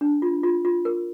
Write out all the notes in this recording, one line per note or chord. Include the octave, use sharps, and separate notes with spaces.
D4
F4
F4
F4
A#4